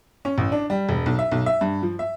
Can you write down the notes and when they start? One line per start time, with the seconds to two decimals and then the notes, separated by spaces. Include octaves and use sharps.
0.25 C#4
0.38 A1
0.52 D4
0.70 G3
0.89 E1
1.06 B1
1.19 E5
1.32 B1
1.46 E5
1.61 G2
1.83 F3
1.99 E5